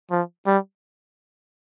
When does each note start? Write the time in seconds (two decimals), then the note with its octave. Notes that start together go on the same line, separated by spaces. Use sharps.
0.11 F3
0.47 G3